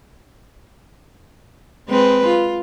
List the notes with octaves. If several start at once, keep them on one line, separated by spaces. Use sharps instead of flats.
G#3 C4 B4
F4